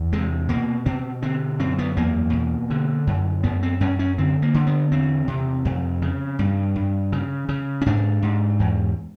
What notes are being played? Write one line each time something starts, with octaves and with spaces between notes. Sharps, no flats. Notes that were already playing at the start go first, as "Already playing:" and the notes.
Already playing: E2
C3 G#3
B2 A#3
B2 C4
D3 C4
F#2 C4
B3
E2 A#3
B2
D3
F#2
F#2 B3
C4
F#2 C#4
C#4
D3 C4
A#3
D3
B3
E2 C4
C3
F2
C#3
G2
G2
C#3
C#3
C#4
G#2 D4
G#2
E2